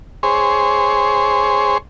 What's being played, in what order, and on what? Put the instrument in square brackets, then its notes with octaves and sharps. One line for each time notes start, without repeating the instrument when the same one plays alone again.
[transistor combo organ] G#4 C5 C#5